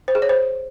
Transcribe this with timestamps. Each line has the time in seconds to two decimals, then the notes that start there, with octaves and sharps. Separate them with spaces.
0.08 C5
0.15 G#4
0.22 C#5
0.29 C5